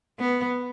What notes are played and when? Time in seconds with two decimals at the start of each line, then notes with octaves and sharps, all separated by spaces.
0.19 B3